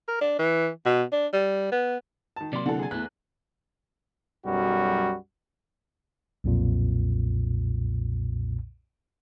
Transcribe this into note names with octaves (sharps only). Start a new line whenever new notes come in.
A#4
D4
E3
B2
D4
G3
B3
D#3 A5
C3 F#3 A#3 D5 C6
D3 E3 A4 F#5
G#4 G#5
E2 A3 B3 F#6
B1 F#2 G3 F#4
B1 F2 A#2